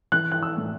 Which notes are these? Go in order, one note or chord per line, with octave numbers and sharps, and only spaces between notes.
E3 F#6
F#6
E6
A2